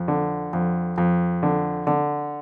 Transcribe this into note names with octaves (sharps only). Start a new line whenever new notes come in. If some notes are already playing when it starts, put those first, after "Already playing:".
Already playing: F2
D3
F2
F2
D3
D3